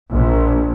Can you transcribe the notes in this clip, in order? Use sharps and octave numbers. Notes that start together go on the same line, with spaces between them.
A#1